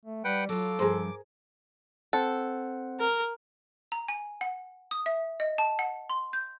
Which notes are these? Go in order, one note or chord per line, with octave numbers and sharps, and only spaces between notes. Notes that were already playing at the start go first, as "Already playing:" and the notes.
A3
G3 B4 F#5 G5
F#3 F4 A4 D6
G2 F3 G#4 A#4 C5
C4 A4 C5 F#5
A#4
A#5
G#5
F#5
D#6
E5
D#5
A5
F#5
C6
G6